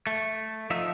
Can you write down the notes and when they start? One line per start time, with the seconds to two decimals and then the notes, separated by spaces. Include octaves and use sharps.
0.07 A3
0.70 F3 D#4 E5